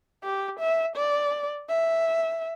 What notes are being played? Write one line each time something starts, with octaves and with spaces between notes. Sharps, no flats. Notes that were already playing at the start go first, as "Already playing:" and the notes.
G4
E5
D5
E5